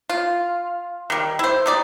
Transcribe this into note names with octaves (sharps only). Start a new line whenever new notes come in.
F4
D#3 G3
E4 C5
D#4 G4 D5